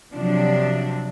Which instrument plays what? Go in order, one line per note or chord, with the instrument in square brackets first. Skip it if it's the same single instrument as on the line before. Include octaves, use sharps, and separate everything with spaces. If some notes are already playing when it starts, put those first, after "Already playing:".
[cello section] C3 F3 F#3 D4